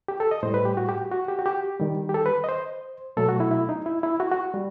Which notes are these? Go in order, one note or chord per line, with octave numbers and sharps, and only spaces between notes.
G4
A4
D#5
A2 G3 C5
B4
G4
F#4
G4
F#4
G4
F#4
G4
D#3 G3
G4
A4
B4
D#5
C5
B2 F#3 A3 A4
F#4
E4
E4
D#4
E4
E4
F#4
F#4
G3